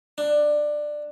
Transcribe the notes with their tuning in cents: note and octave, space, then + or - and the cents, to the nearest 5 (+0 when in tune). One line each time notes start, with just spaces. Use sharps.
D4 +15